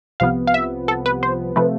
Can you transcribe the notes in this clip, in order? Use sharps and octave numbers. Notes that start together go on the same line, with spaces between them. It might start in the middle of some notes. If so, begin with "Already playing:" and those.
C2 C3 F3 B3 F5
F5
E5
A4
B4
C5
C3 F3 A3 B4